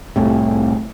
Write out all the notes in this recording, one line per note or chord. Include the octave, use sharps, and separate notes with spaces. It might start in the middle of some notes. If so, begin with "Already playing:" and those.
C2 A2 C3